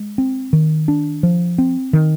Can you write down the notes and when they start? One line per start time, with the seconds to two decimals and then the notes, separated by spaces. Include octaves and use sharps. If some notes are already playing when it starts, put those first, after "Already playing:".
Already playing: G#3
0.18 C4
0.53 D#3
0.88 D4
1.23 F3
1.58 C4
1.93 D#3